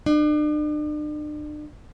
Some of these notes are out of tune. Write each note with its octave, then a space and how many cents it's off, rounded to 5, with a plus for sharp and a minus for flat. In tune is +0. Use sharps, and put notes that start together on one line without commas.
D4 +40